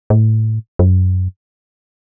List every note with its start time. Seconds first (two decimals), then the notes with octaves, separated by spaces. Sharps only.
0.10 A2
0.79 F#2